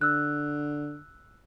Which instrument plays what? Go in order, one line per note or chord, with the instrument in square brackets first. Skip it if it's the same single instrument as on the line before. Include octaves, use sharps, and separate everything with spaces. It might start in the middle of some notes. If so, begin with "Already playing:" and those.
[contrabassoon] D3 [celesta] E6 F#6